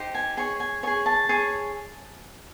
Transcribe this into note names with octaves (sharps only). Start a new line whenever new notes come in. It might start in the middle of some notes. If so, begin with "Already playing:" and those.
Already playing: D#4 G4 C5
G#5
G#4 C#5 G#5
G#5
G#4 C#5 G#5
A5
G#4 C#5